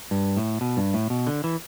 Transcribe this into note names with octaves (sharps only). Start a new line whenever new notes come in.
G2
A2
B2
G2
A2
B2
D3
E3